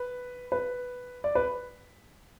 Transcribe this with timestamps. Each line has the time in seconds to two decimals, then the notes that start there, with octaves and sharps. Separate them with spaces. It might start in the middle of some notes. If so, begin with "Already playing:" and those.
Already playing: B4
0.52 B4
1.24 D5
1.35 B4